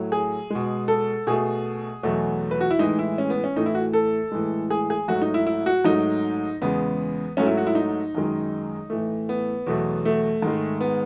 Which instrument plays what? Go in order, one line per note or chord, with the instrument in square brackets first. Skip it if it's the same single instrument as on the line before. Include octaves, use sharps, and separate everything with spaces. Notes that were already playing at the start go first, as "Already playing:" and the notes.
Already playing: [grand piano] A2 F#3 A3
G#4
B2 G#3
A4
B2 A3 G#4
E2 B2 F#3 A3
B4
F#4
E4
A2 E3 G#3 D#4
E4
C#4
B3
C#4
A2 E3 A3 D#4
E4
F#4
A4
A2 E3 G#3
G#4
G#4
G#2 F#3 A3 F#4
D#4
E4
E4
F#4
G#2 F#3 A3 D#4
E2 C#3 G#3 B3
G#2 F#3 A3 C#4
E4
F#4
E4
D#4
F#2 D#3 G#3
A2 E3 A3
B3
E2 B2 F#3 A3
A3
G#2 D#3 G#3
B3